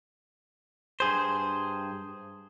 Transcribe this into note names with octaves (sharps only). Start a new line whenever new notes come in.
G2 G#4 C5